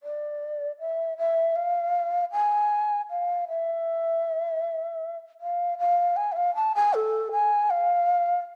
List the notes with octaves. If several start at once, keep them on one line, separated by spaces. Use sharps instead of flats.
D5
E5
E5
F5
G#5
F5
E5
F5
F5
G#5
E5
F5
A5
G#5
A4
G#5
F5